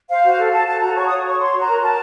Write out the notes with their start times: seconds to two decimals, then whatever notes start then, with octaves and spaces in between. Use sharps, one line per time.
0.09 C5 F5
0.24 F#4
0.38 A4
0.52 A4 A5
0.66 A4 A5
0.81 F#4 A#5
0.96 C#5 C#6
1.07 D#6
1.10 C#5
1.25 C#5 C#6
1.39 C#5 C6
1.54 F#4
1.61 A#5
1.68 A#4
1.83 A#4 A5